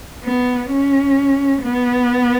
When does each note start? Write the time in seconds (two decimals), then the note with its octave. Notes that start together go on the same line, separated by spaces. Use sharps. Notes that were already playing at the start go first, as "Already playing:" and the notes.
0.24 B3
0.71 C#4
1.63 B3